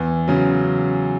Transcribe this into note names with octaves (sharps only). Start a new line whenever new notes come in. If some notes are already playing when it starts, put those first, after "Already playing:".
Already playing: E2
C#3 F#3